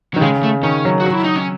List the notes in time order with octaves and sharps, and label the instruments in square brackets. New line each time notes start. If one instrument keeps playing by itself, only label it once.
[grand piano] D#3 [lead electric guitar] F#3
[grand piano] C#3 [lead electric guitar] G#3
[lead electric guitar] A3
[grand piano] D#3 [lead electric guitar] C#4
[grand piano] F#3
[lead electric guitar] F#4
[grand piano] F#3
[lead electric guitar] E4
D#4
C#4